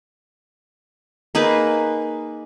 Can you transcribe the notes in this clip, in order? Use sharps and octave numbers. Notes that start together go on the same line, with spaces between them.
A#3 D#4 G#4 B4